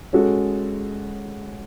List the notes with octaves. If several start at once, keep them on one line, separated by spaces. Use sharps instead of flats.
G#3 C#4 F#4 A4